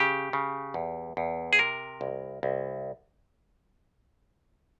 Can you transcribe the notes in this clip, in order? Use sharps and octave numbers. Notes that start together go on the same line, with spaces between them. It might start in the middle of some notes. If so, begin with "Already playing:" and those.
Already playing: C#3 G4
C#3
E2
E2
G#4
C3 A#4
C2
C2